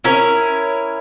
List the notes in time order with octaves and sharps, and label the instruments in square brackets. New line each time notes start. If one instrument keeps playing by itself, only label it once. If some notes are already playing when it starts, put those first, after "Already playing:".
[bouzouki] C#4 E4 A#4 C#5